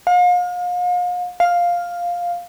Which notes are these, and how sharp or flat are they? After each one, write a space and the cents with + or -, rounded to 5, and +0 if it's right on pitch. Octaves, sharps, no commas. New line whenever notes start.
F5 +40
F5 +5